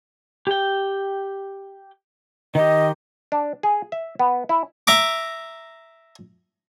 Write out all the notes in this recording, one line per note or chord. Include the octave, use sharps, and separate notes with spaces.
G4 G5
D#3 G4 D#5
D4
G#4
E5
B3
E4
E5 A#5 D6